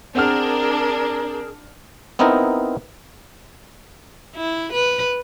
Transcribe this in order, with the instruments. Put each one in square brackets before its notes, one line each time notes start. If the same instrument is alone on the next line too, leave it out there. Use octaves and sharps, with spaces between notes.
[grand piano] C4 F#5 F6 [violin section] D4 [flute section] G#4 A#4
[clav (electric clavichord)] B3 C4 D#4 E4 A#4
[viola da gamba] E4
B4